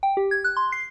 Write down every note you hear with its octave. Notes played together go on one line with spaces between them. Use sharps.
G5
G4
G#6
F#6
C6
C7